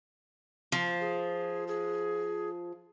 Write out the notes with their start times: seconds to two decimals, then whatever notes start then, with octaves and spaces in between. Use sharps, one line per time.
0.72 F3
1.00 G#4
1.68 G#4